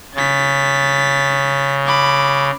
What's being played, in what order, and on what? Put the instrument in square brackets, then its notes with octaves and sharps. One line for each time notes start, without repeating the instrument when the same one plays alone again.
[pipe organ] C#3 [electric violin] A6 B6
[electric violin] B5 D6